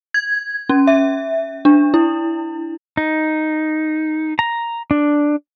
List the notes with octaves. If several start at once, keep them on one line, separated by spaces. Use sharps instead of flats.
G#6
C#4
E5
D4
E4
D#4
A#5
D4